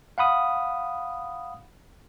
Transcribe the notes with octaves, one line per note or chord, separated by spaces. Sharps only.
F5 F#5 B5 D#6